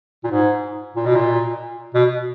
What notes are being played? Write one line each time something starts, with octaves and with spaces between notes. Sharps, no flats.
A#2
G#2
A#2
B2
A#2
B2